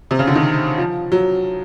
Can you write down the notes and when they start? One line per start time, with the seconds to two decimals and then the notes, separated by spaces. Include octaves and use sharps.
0.11 C3
0.19 C#3
0.27 D3
0.35 D#3
0.78 F3
1.12 F#3